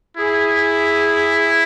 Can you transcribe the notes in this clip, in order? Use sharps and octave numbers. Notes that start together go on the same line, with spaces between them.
E4 G#4